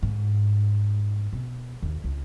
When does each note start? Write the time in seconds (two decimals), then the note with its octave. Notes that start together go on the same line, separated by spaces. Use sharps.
0.03 G#2
1.33 B2
1.82 D#2
2.04 C#2